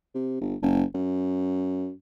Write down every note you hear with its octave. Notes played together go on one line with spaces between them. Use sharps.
C3
G1
F#1
F#2